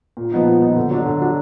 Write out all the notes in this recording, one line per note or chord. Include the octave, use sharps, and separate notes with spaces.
A#2
F3 B3 D#4
A#2
F3 B3 D#4
D3
F#3 D4
D3
F#3 D4